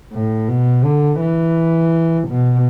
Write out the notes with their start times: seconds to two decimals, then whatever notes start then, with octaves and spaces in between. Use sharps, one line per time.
0.13 A2
0.48 B2
0.84 D3
1.20 E3
2.28 B2